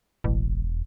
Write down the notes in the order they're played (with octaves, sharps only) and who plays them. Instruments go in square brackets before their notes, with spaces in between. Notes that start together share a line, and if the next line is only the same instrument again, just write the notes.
[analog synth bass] E1 [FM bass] A1